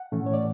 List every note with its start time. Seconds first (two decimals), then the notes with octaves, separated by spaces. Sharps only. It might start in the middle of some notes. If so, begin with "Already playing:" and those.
Already playing: F#5
0.12 A2 E3 A3 C#4
0.26 C#5
0.34 D5